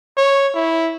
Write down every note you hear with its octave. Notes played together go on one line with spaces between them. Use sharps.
C#5
E4